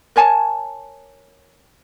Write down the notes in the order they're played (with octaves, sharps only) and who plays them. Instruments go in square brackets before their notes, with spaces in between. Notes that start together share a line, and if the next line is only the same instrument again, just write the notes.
[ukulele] A#4 C#5 G#5 A5